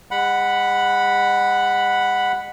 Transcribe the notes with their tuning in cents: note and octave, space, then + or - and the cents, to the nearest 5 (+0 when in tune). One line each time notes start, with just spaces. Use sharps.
G#3 -40 F#5 +0 B5 +0